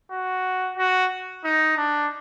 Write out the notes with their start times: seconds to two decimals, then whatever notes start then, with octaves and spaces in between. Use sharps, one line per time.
0.11 F#4
0.77 F#4
1.44 D#4
1.77 D4